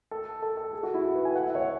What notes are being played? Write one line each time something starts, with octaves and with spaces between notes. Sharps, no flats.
A4
A4
A4
G#4
F#4
E4
A4
B4
G#5
F#5
E5
C#5